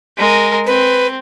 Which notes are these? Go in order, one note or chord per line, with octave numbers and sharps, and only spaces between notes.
G#3 A#4
C4 B4